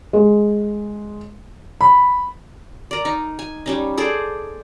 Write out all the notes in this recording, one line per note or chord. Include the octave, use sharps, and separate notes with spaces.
G#3
B5
A#4 D5
D#4
G#5
G3 C#4 D#4
G#4 A4 C5 D5